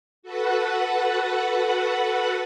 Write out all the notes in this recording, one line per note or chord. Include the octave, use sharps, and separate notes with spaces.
F#4 A4 B4 F#5